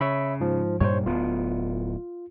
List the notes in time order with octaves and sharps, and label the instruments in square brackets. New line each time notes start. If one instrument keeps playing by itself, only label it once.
[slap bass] C#3 [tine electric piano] C#5 E5 B5
[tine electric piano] G#2 F3
[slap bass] G2 A#2 G3 [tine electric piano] C5 C#5
[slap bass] D1 B3 [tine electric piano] F4